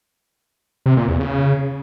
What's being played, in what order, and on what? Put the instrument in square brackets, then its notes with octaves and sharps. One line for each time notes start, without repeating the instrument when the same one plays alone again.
[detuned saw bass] C3
A#2
E2
C#3